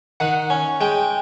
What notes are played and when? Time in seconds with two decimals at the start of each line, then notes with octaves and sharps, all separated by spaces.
0.20 D#3 F#5
0.50 C#4
0.81 G#3 G5